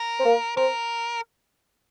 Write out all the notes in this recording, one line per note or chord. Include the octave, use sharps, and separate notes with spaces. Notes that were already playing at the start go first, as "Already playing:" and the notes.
Already playing: A#4
C4
A#3
C4 A#4